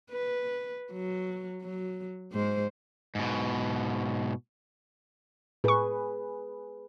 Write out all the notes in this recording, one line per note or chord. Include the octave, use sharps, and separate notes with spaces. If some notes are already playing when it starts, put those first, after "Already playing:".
B4
F#3
F#3
G#2 G#3 C5
G#2 B2
A2 G#4 B4 C#6